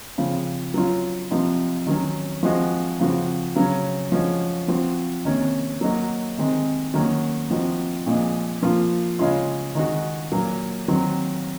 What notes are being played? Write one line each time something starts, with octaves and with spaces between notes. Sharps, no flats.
C#3 F3 C4
F#3 C#4 F4
C3 F3 C4 D#4
D#3 F#3 C#4
F3 G#3 C4 F#4
C#3 F3 C4 F#4
C#3 F#3 C#4
F3 G#3 C#4 F#4
F3 C4 F#4
C3 D#3 A#3 C#4
F#3 A#3 D#4 F#4
C3 D#3 G#3 C4
D#3 F#3 A#3 C#4 F#4
F3 C4 D#4 F#4
A#2 F3 G#3
A#2 F3 A#3 F4
C#3 G#3 C#4 F4
D#3 G#3 D#4 F#4
A#2 F#3 A#3
D#3 F#3 C4 F#4